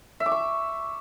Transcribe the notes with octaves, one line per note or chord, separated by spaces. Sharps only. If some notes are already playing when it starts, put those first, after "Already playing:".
E5
D6
C#6